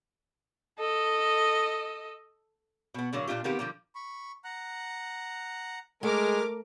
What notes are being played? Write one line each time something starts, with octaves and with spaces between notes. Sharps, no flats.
A4 D#5
B2 B3
A2 D3 F#3 A#3
A#2 D4 F4 G4
C3 D#3 A#3 B3 G4
D3 F3 G3 A#3
B5 C#6
F#5 A#5 F#6
G#3 A3 A#4 D6 F6